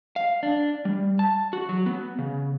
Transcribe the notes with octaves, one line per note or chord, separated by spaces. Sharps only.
F5
D4
G3
A5
F#4
F#3
B3
C#3